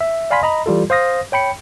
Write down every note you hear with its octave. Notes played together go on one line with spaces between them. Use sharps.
E5
D5 F5 G#5 B5 C6 B6
D#5 A#5 B5
E3 G3 F4 A4
C5 F5 D#6 A#6
C#5 G5 B5 C#7